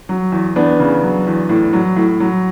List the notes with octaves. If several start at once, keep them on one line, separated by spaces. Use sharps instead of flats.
F#3
E2
E2 B3 D4
C#3
F#3
E2
A2
F#3
A2
F#3